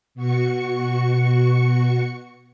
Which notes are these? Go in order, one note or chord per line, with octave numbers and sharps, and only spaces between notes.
B2 F#4 C#6 C#7